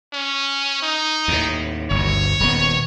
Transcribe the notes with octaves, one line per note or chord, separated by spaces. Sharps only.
C#4
D#4
D#2 A2
G1 D2 C#5
D#1 D#3 B3